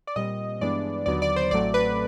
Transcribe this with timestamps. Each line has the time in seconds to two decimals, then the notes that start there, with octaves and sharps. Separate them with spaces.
0.07 D5
0.16 A#2 G3 C4 D#5
0.61 G2 E3 G#3 B3 D4 D5
1.06 D#2 D3 F#3 B3 D5
1.22 D5
1.36 C5
1.51 A1 A2 F#3 A3 C4 D5
1.74 B4